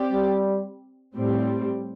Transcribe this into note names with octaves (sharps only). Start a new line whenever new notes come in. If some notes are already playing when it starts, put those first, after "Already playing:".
Already playing: C4 G4 D5
G3
A2 G3 C4